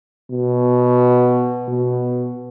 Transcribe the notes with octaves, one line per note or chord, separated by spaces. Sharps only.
B2
B2